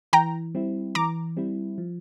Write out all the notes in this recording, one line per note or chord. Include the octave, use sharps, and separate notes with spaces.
E3 G5 A#5
G3 C4 E4
E3 A#5 D6
G3 C4 E4
F3